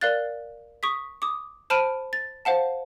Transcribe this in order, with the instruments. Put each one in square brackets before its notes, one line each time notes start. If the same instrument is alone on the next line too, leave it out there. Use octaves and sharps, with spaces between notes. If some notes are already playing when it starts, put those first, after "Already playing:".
[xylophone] A#4 D5 F5 F#6 A6
C#6 D#6 B6
D6 D#6
C5 A5 B5 F6 D7 D#7
A6
C5 F5 F#5 A5